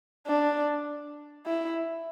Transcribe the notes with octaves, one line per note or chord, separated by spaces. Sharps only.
D4
E4